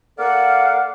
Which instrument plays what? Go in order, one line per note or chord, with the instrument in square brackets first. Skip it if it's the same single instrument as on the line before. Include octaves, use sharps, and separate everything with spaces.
[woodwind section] A#3 A4 D5 F5 F#5